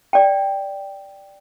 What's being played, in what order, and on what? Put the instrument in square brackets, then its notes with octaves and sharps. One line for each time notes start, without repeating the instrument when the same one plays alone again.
[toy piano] D5 G5